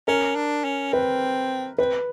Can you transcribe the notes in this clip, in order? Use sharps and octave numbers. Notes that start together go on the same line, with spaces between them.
C#4 A#4
D4
C#4
C4 B4
C4 B4